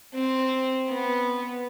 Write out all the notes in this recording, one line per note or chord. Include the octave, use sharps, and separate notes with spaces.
C4
B3